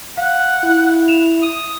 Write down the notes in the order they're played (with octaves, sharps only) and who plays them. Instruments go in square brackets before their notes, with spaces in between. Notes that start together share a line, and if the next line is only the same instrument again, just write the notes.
[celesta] F5 [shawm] F#5
[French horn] E4
[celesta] E7 F7
[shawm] D#6